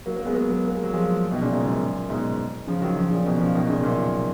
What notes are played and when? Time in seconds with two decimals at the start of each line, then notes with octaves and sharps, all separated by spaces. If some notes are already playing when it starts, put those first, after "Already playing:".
0.06 F#3 A#3
0.16 F#3 A#3
0.25 G#3 B3
0.35 F#3 A#3
0.49 F#3 A#3
0.65 A#3
0.75 G#3
0.83 F#3
0.94 F3 G#3
1.31 B2 D#3
1.42 A#2 C#3
1.52 G#2
1.66 F#2 A#2
2.10 G#2 B2
2.67 C#3 F3
2.82 D#3 F#3
2.97 C#3 F3
3.10 A#2 C#3
3.26 B2 D#3
3.40 C#3 F3
3.55 B2 D#3
3.69 A#2 C#3
3.83 F#2 A#2